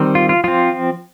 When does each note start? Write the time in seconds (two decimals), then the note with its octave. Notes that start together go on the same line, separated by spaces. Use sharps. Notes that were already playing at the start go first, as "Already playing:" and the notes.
Already playing: D#3 G3 C4
0.15 F4
0.29 F4
0.44 F3 C4 F4